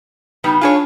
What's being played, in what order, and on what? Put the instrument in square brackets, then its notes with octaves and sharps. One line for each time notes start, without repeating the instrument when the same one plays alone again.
[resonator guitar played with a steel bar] C#3 G3 B3 [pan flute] D#4
[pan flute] D4 [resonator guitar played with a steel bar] F4 G#4 C#5